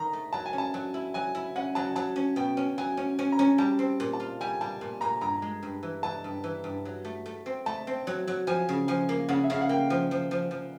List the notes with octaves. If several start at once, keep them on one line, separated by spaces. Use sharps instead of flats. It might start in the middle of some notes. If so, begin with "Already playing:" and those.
Already playing: D#3 A#5
A3
F#3 A5
G#5
C#4
A5
F#3
E4
F#3 G#5
E4
C#4 F#5
F#3 A5
F#3 A5
C#4
B2 G5
C#4
F#3 G#5
C#4
C#4
A#5
C#4
G3 A5
C4
A#2
A5
F4
G3 G#5
G3 A5
A#2
A#2 A#5
G2 A#5
G#3
G2
E3
E3 A5
G2
E3
G2
F#3
A3
A3
C4
A3 A5
C4
F#3
F#3
F3 G#5
C#3
F3 G#5
A#3
C#3 F#5
E5
C#3 F5
F#5
A#3 G5
F3
F3
F3
F3